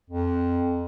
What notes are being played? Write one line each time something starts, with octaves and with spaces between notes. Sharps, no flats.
F2